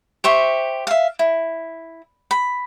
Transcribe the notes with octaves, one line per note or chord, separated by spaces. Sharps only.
G4 C5 E5 C#6
E5 F5
E4
B5